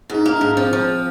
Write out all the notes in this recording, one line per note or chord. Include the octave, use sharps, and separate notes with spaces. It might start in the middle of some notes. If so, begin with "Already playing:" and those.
G#2 D#4
A#3
G#2 D4
F3 C4
F3